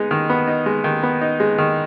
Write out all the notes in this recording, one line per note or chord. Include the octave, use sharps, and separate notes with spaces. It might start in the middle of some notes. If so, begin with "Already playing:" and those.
Already playing: G#3 B3 D#4
D#3
B3
D#4
G#3
D#3
B3
D#4
G#3
D#3